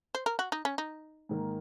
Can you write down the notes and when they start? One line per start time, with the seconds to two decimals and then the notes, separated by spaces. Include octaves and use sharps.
0.15 C5
0.26 A#4
0.39 F#4
0.52 D#4
0.65 C#4
0.78 D#4
1.29 G#2 D#3 A#3